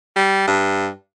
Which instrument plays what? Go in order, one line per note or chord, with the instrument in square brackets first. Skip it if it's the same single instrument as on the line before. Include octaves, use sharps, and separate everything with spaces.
[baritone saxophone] G3
G2